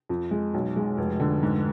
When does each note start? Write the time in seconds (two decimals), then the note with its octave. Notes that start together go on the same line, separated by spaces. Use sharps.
0.09 F2
0.31 G#3
0.54 B1
0.76 G#3
0.98 F1
1.20 D3
1.43 G#2